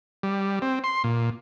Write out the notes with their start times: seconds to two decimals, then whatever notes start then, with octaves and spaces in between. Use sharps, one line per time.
0.23 G3
0.62 C4
0.84 C6
1.04 A#2